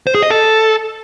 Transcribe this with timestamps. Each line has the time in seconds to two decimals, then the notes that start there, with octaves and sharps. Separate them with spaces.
0.07 C5
0.15 G#4
0.23 D#5
0.30 A4